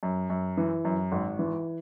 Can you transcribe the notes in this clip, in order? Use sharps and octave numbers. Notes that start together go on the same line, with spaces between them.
F#2
F#2
E3
F#2
G#1
E3